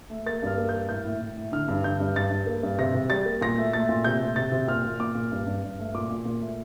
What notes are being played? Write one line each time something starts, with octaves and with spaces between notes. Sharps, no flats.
A3
A#3 A6
G2 F6
A#3
G6
A#3
A2 G6
A2
A2
A2
D3 F6
G2
D3 G6
G2
G2 A6
G2
A#3
G2
C3 A#6
C3
G3 A6
A#3
A#2 A#6
A3
A3 A6
A#2
C3 G6
A3
C3 A6
C3
A#2 F6
A#2
A#2 D6
A#2
G2
G2
G2
A3
A#2 D6
A#2
A#2
A3